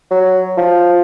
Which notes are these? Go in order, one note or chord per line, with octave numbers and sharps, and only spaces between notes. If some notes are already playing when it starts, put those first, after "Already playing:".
F#3
F3